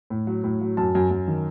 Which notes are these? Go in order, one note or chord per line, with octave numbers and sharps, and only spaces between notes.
A2
F#3
A2
F#3
F#2 A5
F#2
F#2
D#3